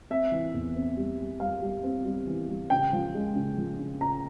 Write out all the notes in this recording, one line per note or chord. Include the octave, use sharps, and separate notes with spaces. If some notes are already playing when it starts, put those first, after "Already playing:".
C4 E5
E3
E2
C4
G3
G3
G3 F5
G3
C4
G3
E3
G3
C#3 G5
F3
G#3
C#3
F3
C#3
C#3 A#5